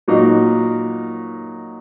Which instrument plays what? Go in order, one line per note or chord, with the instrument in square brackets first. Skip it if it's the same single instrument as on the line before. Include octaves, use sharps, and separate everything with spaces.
[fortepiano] A#2 F#3 A#3 D#4 F#4